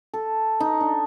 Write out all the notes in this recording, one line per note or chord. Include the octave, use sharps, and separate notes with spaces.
A4
D#4
D4